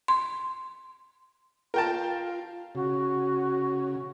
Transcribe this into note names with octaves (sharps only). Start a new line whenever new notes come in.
C6
F4 A#4 G5 A5
C#3 F#4